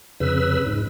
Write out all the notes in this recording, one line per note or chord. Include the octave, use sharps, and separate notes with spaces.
F2 C#3 B4 E6
G#2